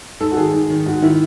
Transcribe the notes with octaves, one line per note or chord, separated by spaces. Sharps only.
G#2 A4
F#4
D#3 G#4
G#2
D#3
G#2 F#4
D#3 E4